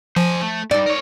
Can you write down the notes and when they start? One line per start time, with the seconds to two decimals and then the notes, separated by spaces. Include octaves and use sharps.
0.17 F3 C5 G#5
0.41 A3
0.71 G2 D#4 D5
0.86 A#4 C#5